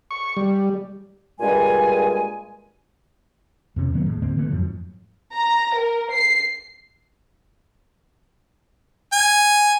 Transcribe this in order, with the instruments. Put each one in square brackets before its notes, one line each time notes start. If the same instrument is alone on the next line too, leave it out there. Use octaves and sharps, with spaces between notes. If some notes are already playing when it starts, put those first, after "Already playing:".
[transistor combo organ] C#6
G3
[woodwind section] G2 A#2 G3 G#3 G#4 G#5
[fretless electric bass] E2 C3 C#4
D#3 F#3 A#3 B3
D#2 A2 G#3
A2 D3 A#3 C4
D3 E3 A3 B3
F2 G#2 F3 F#3
[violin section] A#5
A#4
C7
[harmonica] G#5